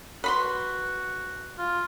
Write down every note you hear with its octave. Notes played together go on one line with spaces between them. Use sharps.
F#4 B4 B5 C6
F4